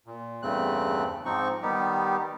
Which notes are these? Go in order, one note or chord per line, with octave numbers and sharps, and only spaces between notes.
A#2
E2 G2 C#3 A3 C4 F#6
G#2 F3 C4 D#4 C#6
D#3 G3 B3 D#4 G4